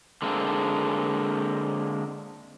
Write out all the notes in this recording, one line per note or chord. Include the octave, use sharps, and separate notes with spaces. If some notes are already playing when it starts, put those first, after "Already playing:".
D3 G#3 A#3 C4 D4